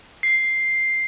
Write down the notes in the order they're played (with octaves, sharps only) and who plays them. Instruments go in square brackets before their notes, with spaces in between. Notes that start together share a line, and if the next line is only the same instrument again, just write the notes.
[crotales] C7